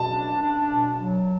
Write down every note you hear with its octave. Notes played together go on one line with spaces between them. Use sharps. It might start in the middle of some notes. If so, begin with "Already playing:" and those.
Already playing: B2 A5
D4
D4
B2
F#3